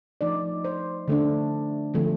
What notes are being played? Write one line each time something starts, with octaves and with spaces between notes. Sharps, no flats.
F3 A3 D#4 D5
C5
D3 A3 D4
D3 F3 A3 C4